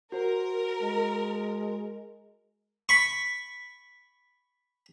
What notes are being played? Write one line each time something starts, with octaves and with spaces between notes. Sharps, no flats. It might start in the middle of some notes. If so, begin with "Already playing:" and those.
F#4 A#4 C5
G#3
B5 C#6